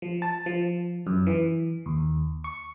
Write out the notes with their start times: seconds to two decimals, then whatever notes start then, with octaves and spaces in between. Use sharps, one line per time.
0.02 F3
0.22 A5
0.46 F3
1.07 F#2
1.27 E3
1.86 D#2
2.44 C#6